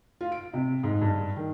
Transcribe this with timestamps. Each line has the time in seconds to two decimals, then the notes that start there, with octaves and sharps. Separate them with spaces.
0.21 F4
0.32 D7
0.54 C3
0.83 G#2
1.02 G2
1.36 D#3